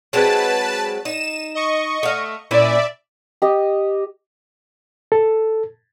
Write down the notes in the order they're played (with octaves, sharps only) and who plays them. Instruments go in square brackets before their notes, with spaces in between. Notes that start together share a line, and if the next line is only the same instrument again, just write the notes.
[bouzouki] F#3 G#3 C4 [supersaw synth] B4 A5
[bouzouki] D#4 [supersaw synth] E7
[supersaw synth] D#5 C#6
[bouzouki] A3 F5
[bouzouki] A#2 C#4 E4 [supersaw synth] D5 E5
[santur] G4 D#5
[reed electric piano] A4